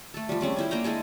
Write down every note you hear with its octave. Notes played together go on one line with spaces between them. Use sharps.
A3 A4
F3 G3
G3 C4 C#4 G#4
C#4 E4 C5
A#3 D4 G5 A#5
G#3 E4 G#4 A4